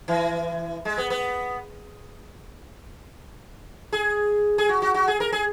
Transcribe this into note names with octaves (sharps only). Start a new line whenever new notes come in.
E3
G#3
B3
B3
G#4
G#4
F#4
F#4
F#4
G#4
A#4
G#4